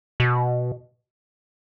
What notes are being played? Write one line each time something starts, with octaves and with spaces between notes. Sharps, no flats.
B2